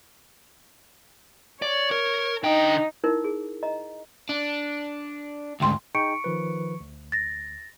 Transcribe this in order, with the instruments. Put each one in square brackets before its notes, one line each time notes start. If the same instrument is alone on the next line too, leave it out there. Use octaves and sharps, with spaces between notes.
[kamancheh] C#5 [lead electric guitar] D5
[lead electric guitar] A#4
[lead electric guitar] D3 G5 [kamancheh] D#4
[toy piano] D#4 E4 A#4
G#4
D#5 A#5
[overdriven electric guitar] D4
[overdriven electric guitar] D2 G#2 [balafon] G5 C6
[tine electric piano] D#4 G#4 G5 [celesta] C#6 C#7 D7
[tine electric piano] D#3 F3 B4
D2
[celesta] A6 A#6